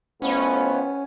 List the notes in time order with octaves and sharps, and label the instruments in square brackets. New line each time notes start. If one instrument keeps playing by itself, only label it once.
[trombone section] F2 A2 B3 [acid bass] C#4